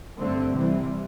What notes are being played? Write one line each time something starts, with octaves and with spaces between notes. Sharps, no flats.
G2 D3 A3 C4
C3 E3 G3 C4